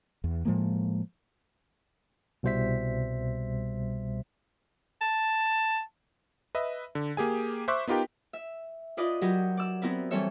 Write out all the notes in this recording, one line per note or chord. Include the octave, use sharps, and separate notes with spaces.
E2
A2 F3 G#3 A#3
C2 B2 G3 C5 E5 B6
A5
B4 D#5 E5
D3
A#3 G4 G#4 G#5
C5 E5 C#6 D6 F#6 B6
B3 D#4 F4 G4 A#4 G5
E5
E4 F4 B4 D5 D#5
F#3 F#4 G4 A#4 B4
D5 E6
B3 C4 E4 A#4 B4
E3 G3 C4 A4 C#5 E5